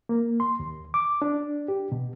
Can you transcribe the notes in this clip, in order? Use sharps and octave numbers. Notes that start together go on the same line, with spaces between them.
A#3
C6
D#2
D6
D4
G4
B2